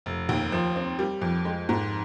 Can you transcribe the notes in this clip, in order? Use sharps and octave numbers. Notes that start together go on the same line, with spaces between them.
F1
D#2
F3
C4
G3
F2
G#3
G#2